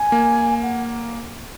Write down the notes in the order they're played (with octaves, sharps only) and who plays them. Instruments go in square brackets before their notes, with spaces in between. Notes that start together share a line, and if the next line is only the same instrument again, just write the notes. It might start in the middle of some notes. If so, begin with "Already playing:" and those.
Already playing: [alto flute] G#5
[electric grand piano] A#3
[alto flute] F#5